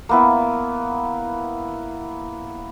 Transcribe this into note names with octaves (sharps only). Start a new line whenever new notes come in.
A#3 B3 E4